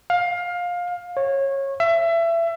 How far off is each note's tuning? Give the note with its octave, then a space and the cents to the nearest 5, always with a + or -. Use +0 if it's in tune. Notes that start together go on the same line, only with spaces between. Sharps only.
F5 +20
C#5 -20
E5 +25